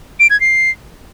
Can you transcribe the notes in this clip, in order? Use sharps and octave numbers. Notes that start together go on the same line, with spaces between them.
D7
G#6
C7